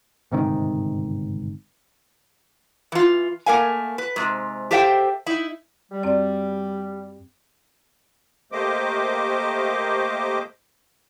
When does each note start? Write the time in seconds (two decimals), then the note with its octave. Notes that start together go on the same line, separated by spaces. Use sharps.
0.32 G1 G#2 C3 D#3
2.92 E3 F4
3.46 A3 A#3 A#4 F5 G#5
3.98 B4
4.16 G#2 C3
4.71 G4 A4 C5 E5 F5 G5
5.26 D#4 E4
5.92 G3
6.03 F#2 C4 D5
8.52 A3 A#3 G4 C5 D#5 D6